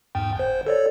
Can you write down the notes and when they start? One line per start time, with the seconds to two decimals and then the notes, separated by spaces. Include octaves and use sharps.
0.15 E2 G#2 G5
0.35 G1 C5
0.67 A4 C#5 D5